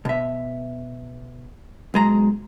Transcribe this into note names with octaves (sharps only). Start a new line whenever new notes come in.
B2 E5
B1 G#3 A#5